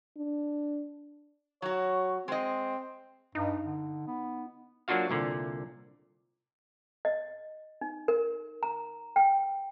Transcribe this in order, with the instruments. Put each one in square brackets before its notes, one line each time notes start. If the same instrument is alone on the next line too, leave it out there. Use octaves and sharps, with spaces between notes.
[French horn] D4
[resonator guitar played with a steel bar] F#3 F#4 [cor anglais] C#5
[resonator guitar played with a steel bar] G#3 D#5 [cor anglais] C4
[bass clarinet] G2 [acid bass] D#4
[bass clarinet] D3
B3
[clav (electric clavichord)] F#3 A#3 D4 F4 F#4 F5
C2 A#2 D3
[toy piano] D#5
D#4
A#4
A#5
G5